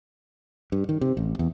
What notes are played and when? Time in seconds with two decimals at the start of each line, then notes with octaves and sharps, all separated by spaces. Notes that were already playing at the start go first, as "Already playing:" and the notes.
0.72 G2
0.89 D#3
1.01 C3
1.17 A1
1.39 E2